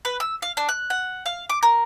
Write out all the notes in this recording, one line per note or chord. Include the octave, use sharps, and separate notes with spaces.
B4
E6
F5
D4
F#6
F#5
F5
D6
A#4